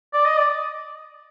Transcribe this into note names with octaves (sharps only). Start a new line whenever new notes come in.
D5
D#5
D5